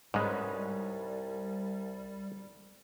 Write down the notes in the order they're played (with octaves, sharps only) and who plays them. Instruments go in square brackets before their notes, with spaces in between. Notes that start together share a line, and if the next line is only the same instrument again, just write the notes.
[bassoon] C2 [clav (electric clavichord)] G#2 G#3 [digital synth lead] G3 [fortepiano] C#4 D#4 B4